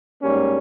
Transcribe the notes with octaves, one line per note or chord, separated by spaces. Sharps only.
G#2 G3 A#3 C#4